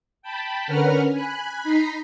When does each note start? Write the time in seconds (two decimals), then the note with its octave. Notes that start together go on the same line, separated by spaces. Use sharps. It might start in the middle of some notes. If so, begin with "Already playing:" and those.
0.22 G5 A5 B5
0.66 D3 C#4 A#4 B4 F#5 F6
1.11 G#5 B5 F#6
1.64 D#4 A#5 B5 B6 C7